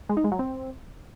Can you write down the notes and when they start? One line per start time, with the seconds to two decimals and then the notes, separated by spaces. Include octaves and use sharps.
0.09 G#3
0.17 D#4
0.24 G#3
0.32 F#3
0.39 C4